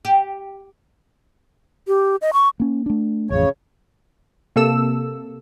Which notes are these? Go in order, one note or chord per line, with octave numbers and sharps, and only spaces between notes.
G4
G4
D#5
C#6
A#3 C#4
A3 D4
A1 F2 C#3 F3 C#5
C3 A#3 A4 E6 E7